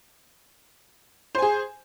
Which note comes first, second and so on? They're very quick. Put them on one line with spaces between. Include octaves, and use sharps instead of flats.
C5 G#5 G#4